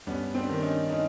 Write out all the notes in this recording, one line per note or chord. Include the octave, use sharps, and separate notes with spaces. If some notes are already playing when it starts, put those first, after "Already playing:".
G2 B3 C#4
C4 D4
D#3 D4
C#4 D#4
C#4 D#4